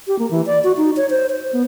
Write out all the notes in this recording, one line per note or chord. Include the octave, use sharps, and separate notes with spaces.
G4
A#3
E3
D5
F#4
D#4
C#5
C5
C5
B3